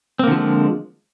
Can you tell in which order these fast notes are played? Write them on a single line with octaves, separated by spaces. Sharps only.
C4 A#3 D3 F3 G#3